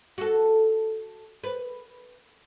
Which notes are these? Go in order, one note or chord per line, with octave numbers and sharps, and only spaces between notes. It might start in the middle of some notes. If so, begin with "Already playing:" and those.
F#4 A4
B4